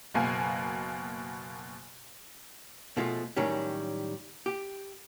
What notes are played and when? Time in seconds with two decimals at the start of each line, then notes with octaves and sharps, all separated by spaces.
0.14 F#1 B2 A#3 G#5
2.97 B2 F3 G#3 A3 F4
3.37 A2 D#3 F#3 G3 C#4
4.46 G4